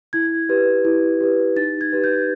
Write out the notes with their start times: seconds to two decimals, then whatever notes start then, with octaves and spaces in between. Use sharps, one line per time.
0.13 E4 G#6
0.49 G4 B4
0.85 E4
1.21 G4 B4
1.56 D#4 A6
1.81 G#6
1.93 G4 B4
2.04 G6